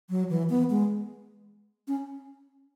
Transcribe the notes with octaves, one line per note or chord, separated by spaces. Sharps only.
F#3
E3
B3
G#3
C#4